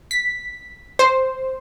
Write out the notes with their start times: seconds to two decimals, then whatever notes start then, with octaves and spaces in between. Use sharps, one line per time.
0.11 B6
0.99 C5